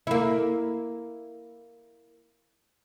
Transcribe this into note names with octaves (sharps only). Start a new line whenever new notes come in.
A#3 E4